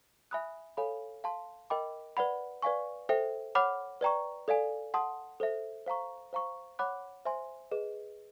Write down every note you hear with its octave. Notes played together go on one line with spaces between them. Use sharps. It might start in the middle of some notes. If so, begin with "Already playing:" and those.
E5 G#5 B5 D#6 F#6
A4 C#5 F5 G#5 B5
F5 A5 C6
A#4 D#5 G5 B5 D6
B4 D5 F#5 B5
B4 D5 F5 G#5 C#6
A4 C5 E5 G5
C#5 F#5 B5 D6 F6
B4 D5 G5 A#5 C#6
A4 D5 F5 G#5
F#5 A5 C6 D#6
A4 C5 E5
C5 F5 A#5 C#6
C5 F5 A#5 C#6
C#5 F#5 B5 D6 F#6
C5 E5 G#5 C6
G#4 B4 D#5